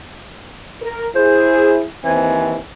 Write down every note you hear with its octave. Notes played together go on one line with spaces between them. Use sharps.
A#4
E4 G#4 C5
D#2 E3 C4 G#5